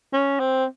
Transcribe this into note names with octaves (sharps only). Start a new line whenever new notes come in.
C#4
C4